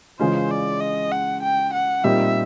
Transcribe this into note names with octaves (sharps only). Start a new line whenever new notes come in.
C#3 E3 G#3 C#4 F4 C5
D5
D#5
F#5
G5
F#5
A#2 G3 C4 D#4 G4 E5